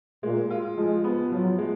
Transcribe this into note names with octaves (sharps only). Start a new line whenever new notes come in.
A#2 G#3
F4
F3 G#3
B3
F3 F#3
G#3